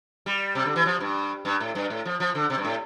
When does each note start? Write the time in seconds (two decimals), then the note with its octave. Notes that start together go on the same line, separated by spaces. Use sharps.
0.26 G3
0.55 C3
0.65 D3
0.76 E3
0.86 F3
1.00 G2
1.45 G2
1.61 A2
1.75 G2
1.90 A2
2.05 F3
2.20 F3
2.35 D3
2.50 C3
2.58 G2
2.65 A2